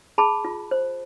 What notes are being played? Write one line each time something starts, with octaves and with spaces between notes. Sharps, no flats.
G#4 A5 B5
F4
C5